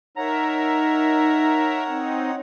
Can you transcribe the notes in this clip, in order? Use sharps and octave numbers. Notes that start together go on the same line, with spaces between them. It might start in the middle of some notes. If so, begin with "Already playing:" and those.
D#4 A#4 C#5 E5 F#5 A#5
C4 D#4